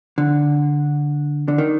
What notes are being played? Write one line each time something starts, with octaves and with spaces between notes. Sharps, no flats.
D3
D3
D#3